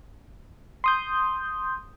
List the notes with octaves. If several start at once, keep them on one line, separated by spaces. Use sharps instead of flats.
C6 D#6 G6